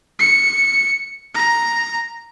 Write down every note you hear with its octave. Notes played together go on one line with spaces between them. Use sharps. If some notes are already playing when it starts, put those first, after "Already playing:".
C#7
A#5